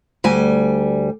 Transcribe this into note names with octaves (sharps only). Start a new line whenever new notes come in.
D2 G3 G#5